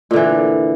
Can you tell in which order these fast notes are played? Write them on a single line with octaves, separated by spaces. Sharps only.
A#2 D3 E3